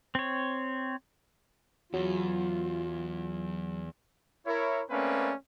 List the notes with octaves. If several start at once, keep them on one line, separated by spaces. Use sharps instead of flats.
C4 C#5
E2 F#3 F4
E4 A#4 C#5
A3 A#3 C4 C#4 B4 D5